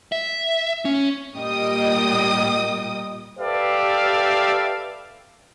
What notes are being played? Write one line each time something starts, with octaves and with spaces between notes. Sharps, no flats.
E5
C#4
A#2 G3 A#3 D#5 G5 D#6
G4 A4 B4 D5 E5 F5